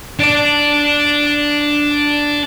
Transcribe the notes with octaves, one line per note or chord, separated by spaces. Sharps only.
D4 D5